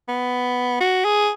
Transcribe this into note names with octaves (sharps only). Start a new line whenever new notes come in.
B3
F#4
G#4